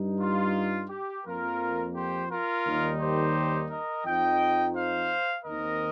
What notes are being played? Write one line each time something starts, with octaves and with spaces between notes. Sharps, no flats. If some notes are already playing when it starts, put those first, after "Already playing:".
Already playing: G2 G3 D#4
F4
G4
F2 F3 A#3 F4 A#4
G4 C5
F4 A#4
D#2 D#3 G3 D#4
G4 C5
A#4 D#5
F2 F3 D#4 D#5 G5
C5 F5
D#2 D#3 C4 A#4 D#5